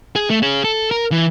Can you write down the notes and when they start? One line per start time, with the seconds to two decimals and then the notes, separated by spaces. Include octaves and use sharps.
0.16 G#4
0.30 A3
0.43 G#4 C#5
0.64 A4
0.91 A#4
1.12 E3